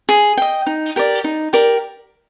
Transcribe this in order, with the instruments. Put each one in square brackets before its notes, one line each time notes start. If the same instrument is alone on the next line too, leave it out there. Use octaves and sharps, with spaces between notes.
[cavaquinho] G#4
D#5 G5
D#4
G4 A#4 D5
D#4
G4 A#4 D5